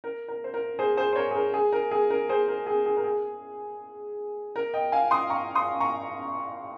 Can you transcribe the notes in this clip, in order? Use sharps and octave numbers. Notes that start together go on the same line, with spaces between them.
A#4
A#4
C5
A#4
G#4 C5
G#4 C5
C5
A#4 C#5
G#4
A#4
G#4
A#4
G#4
A#4
G#4 C5
A#4
G#4
G#4
A#4
G#4
A#4
D#5 G5
F5 G#5
C6 D#6
A#5 C#6
C6 D#6
A#5 C#6